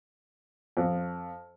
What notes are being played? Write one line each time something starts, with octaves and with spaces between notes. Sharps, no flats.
F2